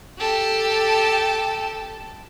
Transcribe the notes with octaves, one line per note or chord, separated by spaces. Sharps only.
G4 A4